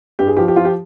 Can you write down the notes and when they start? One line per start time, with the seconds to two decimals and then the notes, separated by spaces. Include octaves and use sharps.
0.19 G2 G4
0.27 G#4
0.37 F3 G4
0.48 G4
0.56 F3 F4
0.65 G4